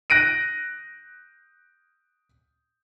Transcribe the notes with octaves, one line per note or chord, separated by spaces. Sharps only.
F#6 A#6 D7 D#7